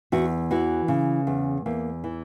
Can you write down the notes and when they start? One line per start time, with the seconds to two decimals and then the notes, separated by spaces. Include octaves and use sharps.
0.12 E2 F#4
0.51 E3 F#4
0.88 C#3
1.27 E2
1.66 E2 A#3
2.04 E3